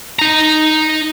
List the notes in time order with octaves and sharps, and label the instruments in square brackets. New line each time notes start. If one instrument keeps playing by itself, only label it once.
[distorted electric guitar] D#4 A#5